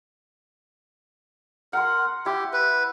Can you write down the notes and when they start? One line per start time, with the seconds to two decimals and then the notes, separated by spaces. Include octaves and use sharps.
1.73 A#4 F#5 C6
2.26 E4 G4
2.53 B4